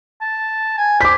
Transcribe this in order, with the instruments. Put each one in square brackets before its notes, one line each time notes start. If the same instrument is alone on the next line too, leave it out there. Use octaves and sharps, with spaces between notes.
[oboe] A5
G#5
[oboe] C5 [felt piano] D6 B6